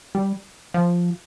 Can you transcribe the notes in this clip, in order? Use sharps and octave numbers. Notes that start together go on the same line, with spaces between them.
G3
F3